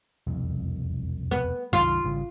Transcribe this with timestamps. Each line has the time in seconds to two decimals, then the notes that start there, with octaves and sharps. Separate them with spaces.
0.27 E1 C2 F2
1.31 B3
1.73 C2 F#2 D#3 F4
2.04 G#1 C#3 G3